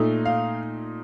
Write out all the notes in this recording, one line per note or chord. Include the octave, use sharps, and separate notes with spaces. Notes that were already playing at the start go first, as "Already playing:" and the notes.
Already playing: A#2 A3 D#4
F5